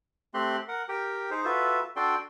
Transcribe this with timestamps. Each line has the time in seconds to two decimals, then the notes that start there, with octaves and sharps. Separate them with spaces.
0.34 A3 C4 G4 C6 F#6
0.68 A#4 F#5
0.89 G4 A#4 G5
1.31 D#4 G#4 C5
1.45 F4 F#4 A4 B4 E5
1.96 D4 F#4 A4 D5 G5 C6